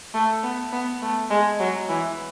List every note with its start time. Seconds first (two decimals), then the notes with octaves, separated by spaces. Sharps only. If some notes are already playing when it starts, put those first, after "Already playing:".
0.14 A3
0.43 B3
0.72 B3
1.02 A3
1.30 G#3
1.60 F#3
1.89 E3